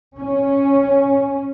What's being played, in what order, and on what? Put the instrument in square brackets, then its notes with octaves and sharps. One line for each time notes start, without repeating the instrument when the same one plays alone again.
[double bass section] C#4